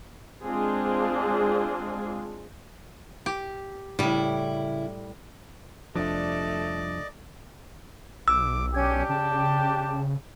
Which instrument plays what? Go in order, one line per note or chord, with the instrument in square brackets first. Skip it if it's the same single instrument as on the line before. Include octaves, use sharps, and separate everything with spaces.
[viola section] G#3 C4 D4 F4 G#4
[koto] G4
[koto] A2 G3 [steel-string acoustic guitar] C#3 E4
[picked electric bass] F1 F3 [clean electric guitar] C2 D4 [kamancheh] A3 [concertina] D5 D#5 D6
[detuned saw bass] B1 [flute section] D6 [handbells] E6
[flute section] C#4 G#5 G#6 [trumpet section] D4 G4
[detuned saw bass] C#3 [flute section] G5 A5